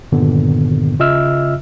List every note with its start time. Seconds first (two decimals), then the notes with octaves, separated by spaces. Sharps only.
0.12 G2 A#2 D3 D#3 B3
0.99 C#3 F4 D#5 E5 E6 F6